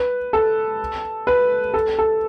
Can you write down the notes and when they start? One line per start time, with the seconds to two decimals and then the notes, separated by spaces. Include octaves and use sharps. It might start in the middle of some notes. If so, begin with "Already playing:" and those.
Already playing: B4
0.33 A4
1.27 B4
1.74 A4
1.99 A4